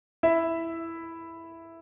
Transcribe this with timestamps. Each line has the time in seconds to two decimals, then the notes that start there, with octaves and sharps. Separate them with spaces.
0.23 E4 E5